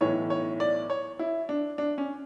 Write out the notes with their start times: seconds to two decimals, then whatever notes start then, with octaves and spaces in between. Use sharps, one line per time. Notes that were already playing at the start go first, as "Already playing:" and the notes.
0.01 B1 A2 E3 C#5
0.30 C#5
0.60 D5
0.90 C#5
1.19 E4
1.49 D4
1.78 D4
1.98 C#4